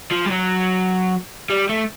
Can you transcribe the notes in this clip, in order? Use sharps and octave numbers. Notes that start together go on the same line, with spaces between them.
F3
G3
F#3
G3
A3